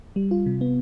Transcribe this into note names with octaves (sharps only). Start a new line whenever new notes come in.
G3
F4
C3
B3